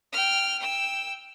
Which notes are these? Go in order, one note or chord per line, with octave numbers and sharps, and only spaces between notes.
G5 F6
G5 E6